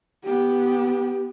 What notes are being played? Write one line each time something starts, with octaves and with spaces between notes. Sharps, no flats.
B3 G4